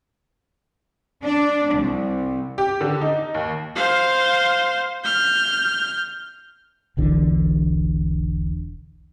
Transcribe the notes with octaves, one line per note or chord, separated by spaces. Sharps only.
D4
C2
G4
D3
D#4
D#2
C5 F5
F6 G6
E1 B1 D3 E3